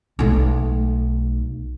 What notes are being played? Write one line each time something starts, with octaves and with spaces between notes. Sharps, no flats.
B1 A3